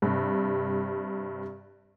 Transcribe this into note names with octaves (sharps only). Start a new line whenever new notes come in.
G2 C3